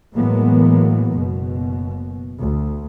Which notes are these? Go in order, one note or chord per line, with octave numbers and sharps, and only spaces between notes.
A2 E3 F#3 G#3 A#3 B3
F#1 B2
D2